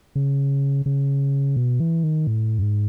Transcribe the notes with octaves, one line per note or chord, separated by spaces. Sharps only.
C#3
C#3
B2
E3
D#3
A2
F#2
G#2